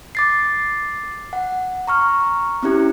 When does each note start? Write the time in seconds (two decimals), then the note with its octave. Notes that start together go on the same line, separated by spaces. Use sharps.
0.15 D6 A6 C7
1.33 F#5
1.88 A#5 C#6 F6
2.63 C4 C#4 E4 G4